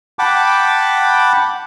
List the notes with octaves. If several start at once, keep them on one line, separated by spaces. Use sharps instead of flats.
F#5 G5 A5 B5 D6